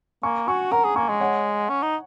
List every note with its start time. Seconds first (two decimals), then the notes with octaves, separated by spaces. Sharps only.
0.23 A#3 G#5 C#6
0.48 F#4 G#5 C#6
0.72 A#4 F#5 A#5
0.84 G#4
0.96 A#3 G#5 C#6
1.09 G#3
1.20 C#5 F#5
1.69 C#4
1.83 D#4